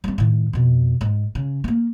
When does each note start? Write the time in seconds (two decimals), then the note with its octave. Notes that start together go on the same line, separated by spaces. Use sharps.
0.04 G3 C4
0.18 A2 D#3
0.53 F2 B2
1.01 G#2
1.35 C#3
1.64 A3 A#3